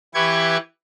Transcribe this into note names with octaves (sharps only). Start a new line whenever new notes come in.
E3 E4 G4 B4 C#6 G#6